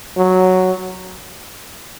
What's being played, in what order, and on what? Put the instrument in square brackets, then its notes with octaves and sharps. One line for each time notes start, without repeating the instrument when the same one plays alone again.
[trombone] F#3